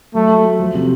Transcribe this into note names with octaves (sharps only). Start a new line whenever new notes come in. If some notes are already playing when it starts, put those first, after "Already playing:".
F#3 A3
F#4
F#4
F3
C3